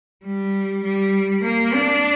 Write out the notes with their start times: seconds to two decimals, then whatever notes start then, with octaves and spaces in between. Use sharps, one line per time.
0.24 G3
0.84 G3
1.44 A#3
1.74 D4